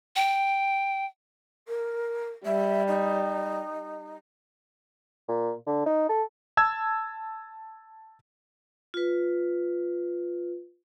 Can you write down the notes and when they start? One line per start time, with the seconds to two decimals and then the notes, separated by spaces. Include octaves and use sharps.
0.16 G5
1.68 A#4
2.45 G3 E5
2.87 D#4
5.28 A#2
5.67 D3
5.86 D#4
6.09 A4
6.57 A5 E6 G#6
8.94 F4 B4